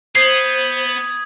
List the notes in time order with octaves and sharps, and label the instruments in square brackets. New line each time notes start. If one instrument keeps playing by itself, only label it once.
[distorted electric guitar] B3 [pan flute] C5 [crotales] D#6 G#6 [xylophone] C7